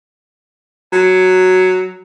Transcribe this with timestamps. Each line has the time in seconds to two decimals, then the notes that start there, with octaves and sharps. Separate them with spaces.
0.93 F#3